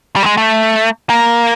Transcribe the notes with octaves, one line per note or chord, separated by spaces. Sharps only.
G3
A3
G#3
A3
A#3